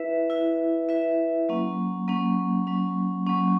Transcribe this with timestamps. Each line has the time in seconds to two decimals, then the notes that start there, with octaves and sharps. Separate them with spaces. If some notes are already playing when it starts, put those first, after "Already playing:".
Already playing: E4 B4 E5
0.30 E4 B4 E5
0.89 E4 B4 E5
1.49 F#3 A#3 C#4
2.08 F#3 A#3 C#4
2.67 F#3 A#3 C#4
3.27 F#3 A#3 C#4